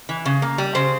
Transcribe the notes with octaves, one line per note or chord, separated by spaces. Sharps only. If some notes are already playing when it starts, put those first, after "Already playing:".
E3
C#3
A#3
G3
C#3 C5